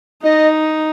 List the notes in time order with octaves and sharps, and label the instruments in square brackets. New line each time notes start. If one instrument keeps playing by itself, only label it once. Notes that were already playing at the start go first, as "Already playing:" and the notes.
[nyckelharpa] D#4 [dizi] D#5